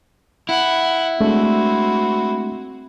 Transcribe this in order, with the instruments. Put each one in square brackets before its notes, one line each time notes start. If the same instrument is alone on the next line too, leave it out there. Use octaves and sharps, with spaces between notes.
[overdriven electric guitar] E4 [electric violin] F#5
[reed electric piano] G#3 A3 D4 [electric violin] C4 F#4